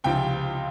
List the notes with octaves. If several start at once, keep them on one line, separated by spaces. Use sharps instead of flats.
C#2 C3 F3 C4 F4 G5